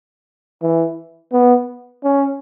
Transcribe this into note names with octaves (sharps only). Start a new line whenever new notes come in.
E3
B3
C#4